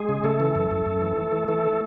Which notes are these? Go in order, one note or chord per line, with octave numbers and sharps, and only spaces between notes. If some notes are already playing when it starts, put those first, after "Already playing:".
Already playing: G#3 G#4
C#3
C#3 A3 A4
E3
F#2
F#2
F#2
E3
E3
E3
E3 A3 A4